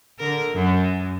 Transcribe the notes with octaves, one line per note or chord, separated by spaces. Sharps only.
D3 A#4
F#2